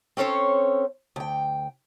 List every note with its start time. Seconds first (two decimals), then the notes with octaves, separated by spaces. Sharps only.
0.17 C4 C#4 A4 C5 C#5
1.16 D2 G5